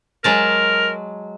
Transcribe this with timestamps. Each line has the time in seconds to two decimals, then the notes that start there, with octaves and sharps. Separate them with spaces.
0.24 F#3 G#3 A#4 A5